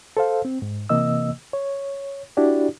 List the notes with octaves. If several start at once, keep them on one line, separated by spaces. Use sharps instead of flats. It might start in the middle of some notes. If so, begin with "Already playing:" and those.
A4 C5 F5
C4
G#2
C3 E3 A#3 D#5 E6
C#5
D4 E4 F#4 G4 D5